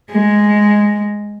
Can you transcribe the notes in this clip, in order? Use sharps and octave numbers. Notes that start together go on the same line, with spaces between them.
G#3